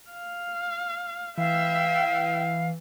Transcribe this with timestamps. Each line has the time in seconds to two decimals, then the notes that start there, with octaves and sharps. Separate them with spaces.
0.11 F5
1.38 E3 E5 F5 G5